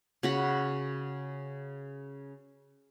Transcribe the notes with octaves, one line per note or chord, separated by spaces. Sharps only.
C#3 F#4 B5